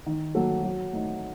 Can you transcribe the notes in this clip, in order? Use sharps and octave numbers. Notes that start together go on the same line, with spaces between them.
D#3
F#3 A#3 F#4 A4
F#3
A3 D#4